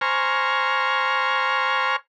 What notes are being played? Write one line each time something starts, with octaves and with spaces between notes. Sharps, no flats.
C5 G#5 A#5 C#6 F6